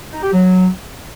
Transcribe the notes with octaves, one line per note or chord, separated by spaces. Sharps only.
D#4
G4
F#3